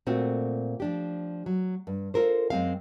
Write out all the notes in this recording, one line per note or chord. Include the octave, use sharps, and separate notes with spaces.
A#2 A3 C4 F4 F#4
F3 D4 G4
F#3
G2
F4 A4 A#4 C5
F#2 G#3 C4 F5